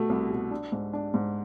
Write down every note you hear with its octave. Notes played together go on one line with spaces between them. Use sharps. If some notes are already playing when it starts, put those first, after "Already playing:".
Already playing: B2 A3
C2
B2
D4
G#2
D4
G#2